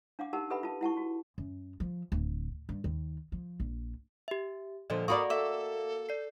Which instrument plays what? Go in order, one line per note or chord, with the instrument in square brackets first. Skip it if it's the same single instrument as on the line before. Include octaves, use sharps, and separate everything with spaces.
[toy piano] D4 F5 F#5 D6
D#4 G4 A#4 F#5 A5
G4 A4 B4 E5 F#5 B5
F4 A5
E4 F#5 A5 C#6
F#4
[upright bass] F#2
F3
D1
G2
D#2
F3
A#1
[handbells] G4 E5
[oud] A#2 D3 F3 [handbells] D#5
[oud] A#3 F#4 D5 [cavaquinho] A#4 B5 D#6 [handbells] C#6
[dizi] A4 [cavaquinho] E5 [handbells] D6
[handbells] D5 C7